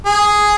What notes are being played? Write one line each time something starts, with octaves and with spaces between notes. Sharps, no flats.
G#4